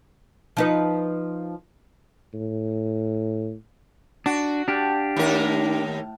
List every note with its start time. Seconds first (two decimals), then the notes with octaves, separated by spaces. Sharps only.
0.57 F3 D#4 B4
2.34 A2
4.26 D4 F#4
4.68 D4 G4 F5 G5 A5
5.17 D#2 A2 A#4